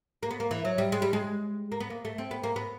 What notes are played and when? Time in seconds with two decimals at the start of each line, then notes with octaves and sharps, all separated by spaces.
0.23 A#3
0.31 B3
0.40 A#3
0.51 E3
0.65 F#3
0.78 G3
0.92 G#3
1.02 G3
1.13 G#3
1.72 A#3
1.80 B3
1.90 A#3
2.05 A3
2.18 C4
2.31 B3
2.43 A#3
2.56 B3